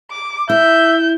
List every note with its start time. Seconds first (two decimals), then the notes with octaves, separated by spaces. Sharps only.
0.11 D6
0.50 E4 E5 G6